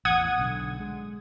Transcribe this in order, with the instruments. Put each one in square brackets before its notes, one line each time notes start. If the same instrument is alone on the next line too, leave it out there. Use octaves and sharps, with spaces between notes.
[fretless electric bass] A1 E2 [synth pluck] F#5 D#6 G#6
[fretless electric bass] B1 D3
G#3